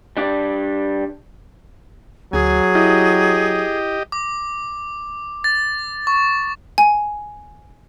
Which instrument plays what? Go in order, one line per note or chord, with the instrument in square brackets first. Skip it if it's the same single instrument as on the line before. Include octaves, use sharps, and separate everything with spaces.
[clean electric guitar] G3 D4 D5
[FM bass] D2 [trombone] F#3 [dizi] G#4 [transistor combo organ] G#5
[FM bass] E4 [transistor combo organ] G4 D#5
[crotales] D6
A6
C#6
[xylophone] G#5